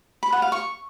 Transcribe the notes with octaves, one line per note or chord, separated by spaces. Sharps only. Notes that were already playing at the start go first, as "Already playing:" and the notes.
B5
F#5
F5
C#6